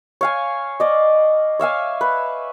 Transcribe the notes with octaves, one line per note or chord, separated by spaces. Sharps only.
C#5 F5 G#5
D5 D#5
C#5 E5 F5 G#5
B4